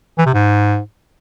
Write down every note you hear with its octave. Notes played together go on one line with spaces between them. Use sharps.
E3
C3
G#2